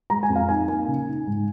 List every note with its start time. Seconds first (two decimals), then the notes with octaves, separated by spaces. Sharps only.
0.10 G#3 A#5
0.23 G#5
0.29 F2
0.36 F5
0.49 D#4 G#5
0.68 A#3 G#5
0.88 C#3
1.07 D#4
1.27 G#2